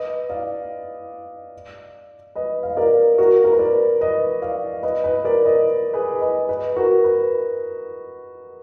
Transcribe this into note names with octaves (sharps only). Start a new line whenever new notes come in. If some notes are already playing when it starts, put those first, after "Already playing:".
Already playing: B4 D#5
D5 F5
B4 D#5
F5
D#5
A#4 D5
F#4 A#4
A#4
B4
A#4 D5
B4 D#5
D5 F5
B4 D#5
B4 D#5
A#4 D5
B4 D#5
G#4 B4
B4 D#5
B4 D#5
F#4 A#4
B4